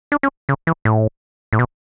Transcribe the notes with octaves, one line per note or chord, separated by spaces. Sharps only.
D4
C#4
C#3
E3
A2
A2
B2